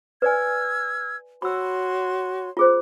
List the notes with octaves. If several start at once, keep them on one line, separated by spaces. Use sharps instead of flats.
B4 D5 G#5 E6 F6 G#6
F#4 C#5 B5 C6 E6
F4 G#4 C5